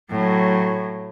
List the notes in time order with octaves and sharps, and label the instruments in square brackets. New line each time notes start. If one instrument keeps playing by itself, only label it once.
[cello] A2 F#3